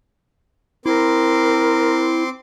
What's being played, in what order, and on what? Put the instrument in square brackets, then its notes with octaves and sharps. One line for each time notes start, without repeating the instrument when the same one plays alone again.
[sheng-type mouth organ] C4 C6 D6 [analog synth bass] E4 [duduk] A#4